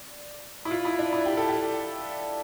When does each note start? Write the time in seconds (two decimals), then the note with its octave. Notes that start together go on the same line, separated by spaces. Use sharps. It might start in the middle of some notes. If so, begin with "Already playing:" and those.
Already playing: D5
0.65 E4
0.71 F4
0.85 E4
0.99 D4
1.13 E4
1.26 G4
1.37 A4
1.49 G4